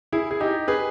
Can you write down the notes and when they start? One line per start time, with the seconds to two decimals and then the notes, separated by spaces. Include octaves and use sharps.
0.12 E4 G#4
0.31 G#4
0.40 D#4 G4
0.68 G#4 B4